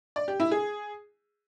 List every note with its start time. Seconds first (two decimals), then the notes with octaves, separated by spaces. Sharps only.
0.16 D5
0.28 G4
0.40 E4
0.51 G#4